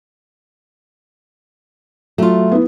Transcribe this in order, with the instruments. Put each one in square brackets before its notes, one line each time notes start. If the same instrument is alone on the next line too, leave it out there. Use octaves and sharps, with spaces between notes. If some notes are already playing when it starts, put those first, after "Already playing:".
[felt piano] F#3 [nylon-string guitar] A3 F4
[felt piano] B3 E4